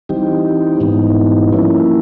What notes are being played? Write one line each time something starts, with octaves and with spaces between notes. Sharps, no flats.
E3 G3 C4 D#4 G4
G#2 E3 G3 B3 D#4
F3 A#3 C#4 E4